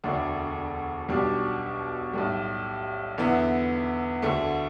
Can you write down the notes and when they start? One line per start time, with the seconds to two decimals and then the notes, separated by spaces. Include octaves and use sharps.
0.04 E1 D2 D3 A3 D4
1.08 B1 B2 G3 D4 G4
2.13 B1 A2 G3
3.18 E2 D3 B3 E4
4.22 D2 D3 A3